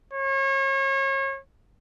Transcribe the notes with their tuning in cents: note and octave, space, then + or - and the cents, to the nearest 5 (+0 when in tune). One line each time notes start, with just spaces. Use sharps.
C#5 -35